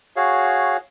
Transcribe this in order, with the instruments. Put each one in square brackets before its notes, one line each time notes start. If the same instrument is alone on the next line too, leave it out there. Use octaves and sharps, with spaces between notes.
[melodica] F#4 G#4 C#5 F5